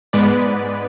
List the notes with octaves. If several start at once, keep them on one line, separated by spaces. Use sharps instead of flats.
G#2 G#3 B3 B4 D5